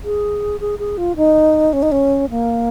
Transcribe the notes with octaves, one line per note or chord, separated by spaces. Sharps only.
G#4
G#4
G#4
F4
D#4
C#4
D#4
C#4
A#3